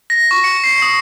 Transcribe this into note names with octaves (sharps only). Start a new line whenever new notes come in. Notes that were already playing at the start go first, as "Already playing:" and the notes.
A#6
C#6
C#7
C7
D#6